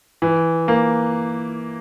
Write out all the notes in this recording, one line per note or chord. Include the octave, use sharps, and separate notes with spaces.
E3
A#3